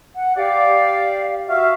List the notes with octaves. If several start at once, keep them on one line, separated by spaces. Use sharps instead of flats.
F#5
G4 D5 F5
F#4 E5 F5